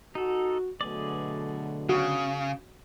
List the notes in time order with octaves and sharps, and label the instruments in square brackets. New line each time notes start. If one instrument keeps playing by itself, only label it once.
[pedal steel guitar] D#4 A4 [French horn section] F#4
[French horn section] B2 F#3 A3 [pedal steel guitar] D3 G#4 D5
[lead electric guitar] C#3 [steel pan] F#4